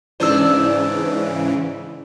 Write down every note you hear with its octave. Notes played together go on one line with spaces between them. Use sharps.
G#2 C#3 E3 D4 C5 D5 E6